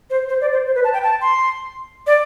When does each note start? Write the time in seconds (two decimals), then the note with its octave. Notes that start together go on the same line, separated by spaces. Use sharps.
0.10 C5
0.29 C5
0.41 D5
0.53 C5
0.66 C5
0.75 B4
0.84 A5
0.94 G5
1.03 A5
1.22 C6
2.07 D5